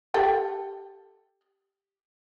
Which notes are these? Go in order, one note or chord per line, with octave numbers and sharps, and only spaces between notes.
G4 A4 G5